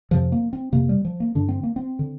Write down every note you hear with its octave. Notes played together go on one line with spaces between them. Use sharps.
F2 C3 F3
A#3
C4
F2 C3 A#3
G3
F3
A#3
G2 D3 D4
C4
A#3
C4
D3